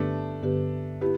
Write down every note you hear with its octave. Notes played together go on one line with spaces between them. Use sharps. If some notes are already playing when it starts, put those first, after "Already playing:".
Already playing: G2 D3 A3 B3 D4 G4 B4
G2 D3 B3 G4 B4
B3 E4 G4